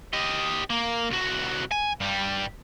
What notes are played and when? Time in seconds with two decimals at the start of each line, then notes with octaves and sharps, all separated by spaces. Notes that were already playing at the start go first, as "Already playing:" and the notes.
0.13 G4 D#5
0.70 A#3
1.10 C2 F#4
1.71 G#5
2.00 G2 G3